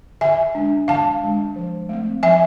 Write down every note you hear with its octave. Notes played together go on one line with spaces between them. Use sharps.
D3 E5 G#5
G#3 D4
D3 F5 A5
G#3 D4
F3
A3 C4
F3 E5 G#5